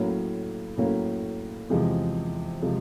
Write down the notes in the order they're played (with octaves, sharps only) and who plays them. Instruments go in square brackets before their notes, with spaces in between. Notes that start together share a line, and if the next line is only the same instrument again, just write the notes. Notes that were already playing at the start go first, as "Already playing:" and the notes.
Already playing: [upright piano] A2 F#3 A#3 C#4
A2 F#3 A#3 C#4
E2 C3 F3 G#3
C3 F3 G#3